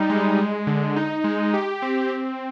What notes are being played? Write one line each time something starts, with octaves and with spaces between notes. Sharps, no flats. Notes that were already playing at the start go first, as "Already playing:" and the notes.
Already playing: G3 D#4
G#3
G#3
D3
D#4
G#3
G4
C4
C4